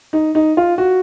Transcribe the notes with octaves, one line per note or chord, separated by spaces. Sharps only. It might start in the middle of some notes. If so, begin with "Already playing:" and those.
D#4
D#4
F4
F#4